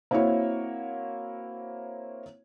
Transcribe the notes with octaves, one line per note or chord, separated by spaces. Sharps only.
A#3 C4 E4 F#4 C#5